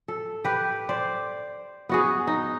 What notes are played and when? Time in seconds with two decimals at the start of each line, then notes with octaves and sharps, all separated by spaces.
0.08 A4
0.44 G4 B4
0.89 C5 D5
1.89 B3 F#4 G#4
2.27 D#4